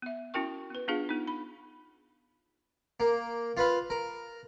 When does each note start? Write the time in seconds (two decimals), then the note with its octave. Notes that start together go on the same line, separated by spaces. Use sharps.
0.02 B3 E5
0.34 C#4 E4 F#4 A#4 G5 C#6
0.70 B3 B4
0.88 B3 D4 F4 G#4 F5
1.09 B3 D#4
1.27 B5
3.00 A#3
3.57 F4 B4 F5
3.90 A#4